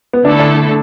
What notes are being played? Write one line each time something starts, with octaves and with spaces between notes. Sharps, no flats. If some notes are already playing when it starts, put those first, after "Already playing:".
B3
D3 A3 D4 E4 A4
D4